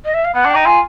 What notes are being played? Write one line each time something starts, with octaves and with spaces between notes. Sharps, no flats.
D#5
E5
F5
B3 F#5
D4
D#4 G5
F4 G#5